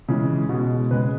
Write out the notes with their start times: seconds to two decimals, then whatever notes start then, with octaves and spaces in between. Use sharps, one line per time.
0.09 C#3 E3 G#3
0.49 B2 G#3
0.91 C#3 G#3 B4